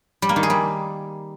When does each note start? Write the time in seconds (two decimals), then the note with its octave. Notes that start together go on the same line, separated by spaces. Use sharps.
0.22 G3
0.29 A#3
0.36 D#3
0.43 G#4
0.50 G3